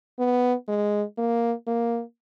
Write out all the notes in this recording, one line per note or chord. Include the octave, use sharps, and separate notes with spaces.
B3
G#3
A#3
A#3